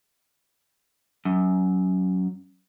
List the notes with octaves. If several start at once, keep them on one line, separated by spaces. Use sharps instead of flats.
F#2